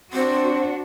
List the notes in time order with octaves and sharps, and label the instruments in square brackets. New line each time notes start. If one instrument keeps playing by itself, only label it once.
[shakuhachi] C4 [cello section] D4 F#4